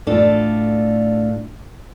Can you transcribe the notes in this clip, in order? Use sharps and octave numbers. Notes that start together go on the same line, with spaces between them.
A2 D4 F4 A4